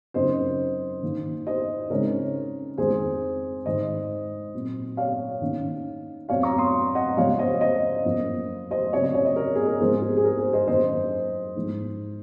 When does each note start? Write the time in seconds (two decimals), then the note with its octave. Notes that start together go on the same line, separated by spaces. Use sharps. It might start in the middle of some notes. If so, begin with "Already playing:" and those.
0.14 F#2 C#3 F#3 C4 D#4 C5 D#5
1.03 D#3 A#3 D#4
1.47 C5 D#5
1.90 C#3 G#3 C4 D#4 A#4 C#5
2.78 F2 D#3 G#3 C4 D#4 G#4 C5
3.66 G#2 D#3 G#3 D#4 C5 D#5
4.54 A#2 F#3 C4
4.97 C#5 F5
5.42 D#3 A#3 C#4
6.29 F2 C3 F#3 C4 C#5 F5
6.43 A#5 C#6
6.58 C6 D#6
6.95 D#5 F#5
7.17 C#3 F3 G#3 C#5 F5
7.39 C5 D#5
7.61 C5 D#5
8.05 F#2 F3 A#3
8.71 C5 D#5
8.93 C#3 F#3 C4 C#5
9.03 D#5
9.14 C#5
9.26 D#5
9.36 A#4 C#5
9.55 G#4
9.67 A#4
9.80 G#2 F3 C4 G#4 C5
10.02 G#4
10.17 G#4
10.24 A#4
10.39 G#4 C5
10.53 C5 D#5
10.67 F#2 D#3 A#3 C5 D#5
11.56 G#2 F3 G#3 D#4